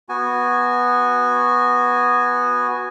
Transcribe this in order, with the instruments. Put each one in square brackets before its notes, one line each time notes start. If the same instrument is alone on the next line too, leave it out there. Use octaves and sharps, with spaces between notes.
[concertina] B3 F#4 G#5